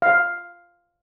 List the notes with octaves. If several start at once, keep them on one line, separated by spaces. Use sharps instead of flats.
F5